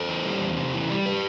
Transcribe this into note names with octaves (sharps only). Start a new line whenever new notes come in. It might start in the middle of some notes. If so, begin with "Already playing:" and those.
Already playing: A4 C5
E3
G3
E2
C3
E3
G3
G4 B4